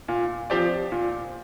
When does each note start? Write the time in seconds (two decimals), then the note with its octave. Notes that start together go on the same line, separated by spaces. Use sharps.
0.08 A#2
0.50 F3 C4 G4 D5
0.92 A#2